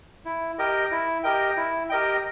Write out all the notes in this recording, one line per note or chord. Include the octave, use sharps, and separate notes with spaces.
E4
G4 A#4 D#5 G5
E4
G4 A#4 D#5 G5
E4
G4 A#4 D#5 G5